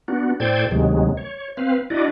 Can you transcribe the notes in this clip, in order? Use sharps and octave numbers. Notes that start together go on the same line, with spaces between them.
B3 D4 F#4
A2 A4 C5 D5 G5 G#6
D2 C3 D#3 F#3 G#3
C#5
C4 B4 F5
D4 E4 F#4 D5 D#5